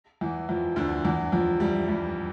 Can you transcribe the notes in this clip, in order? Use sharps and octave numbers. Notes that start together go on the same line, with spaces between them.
E2 E3
F2 F3
D2 D3
E2 E3
F2 F3
G2 G3
G2 G3